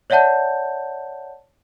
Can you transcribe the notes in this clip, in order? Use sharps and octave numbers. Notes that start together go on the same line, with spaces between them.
C#5 D5 E5 F#5 A5 G6